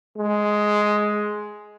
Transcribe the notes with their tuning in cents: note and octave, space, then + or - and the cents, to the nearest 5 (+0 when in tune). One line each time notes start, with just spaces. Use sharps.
G#3 +10